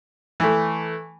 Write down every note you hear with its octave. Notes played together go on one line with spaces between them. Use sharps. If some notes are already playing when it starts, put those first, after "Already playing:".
E3 A3